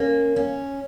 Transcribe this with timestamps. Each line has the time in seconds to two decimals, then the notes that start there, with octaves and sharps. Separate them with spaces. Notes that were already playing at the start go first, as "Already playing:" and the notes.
Already playing: A#3 C#4
0.36 C#4